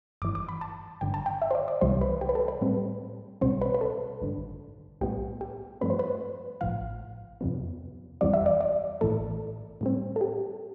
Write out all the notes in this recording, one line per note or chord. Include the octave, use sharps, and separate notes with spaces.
G1 G2 E3 D6
D6
B5
A5
G1 G2 D3 G5
A5
G5
E5
C5
D5
D5
C2 C3 E3 G3 C5
B4
G4
B4
A4
B4
A2 G3 C4
B1 B2 G3 C4 C5
B4
B4
A4
A1 G2 D3
B1 A2 G3 B3 G4
G4
G2 F3 A3 C4 B4
C5
B4
A1 A2 F3 F5
F2 C3 F3 B3
G1 F2 E3 G3 C4 D5
E5
D5
D5
A1 A2 E3 A3 A4
A2 G3 C4
A4
G4